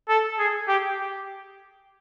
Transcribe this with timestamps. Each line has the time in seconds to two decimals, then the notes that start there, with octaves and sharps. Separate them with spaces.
0.09 A4
0.39 G#4
0.68 G4